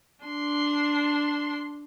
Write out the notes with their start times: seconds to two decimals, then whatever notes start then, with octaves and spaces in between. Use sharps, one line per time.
0.24 D4 C6